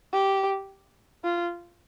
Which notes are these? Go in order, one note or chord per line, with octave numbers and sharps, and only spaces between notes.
G4
F4